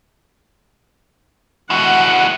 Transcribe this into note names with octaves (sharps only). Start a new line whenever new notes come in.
E4 F#4 F#5